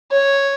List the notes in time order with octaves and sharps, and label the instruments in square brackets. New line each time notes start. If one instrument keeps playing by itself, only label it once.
[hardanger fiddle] C#5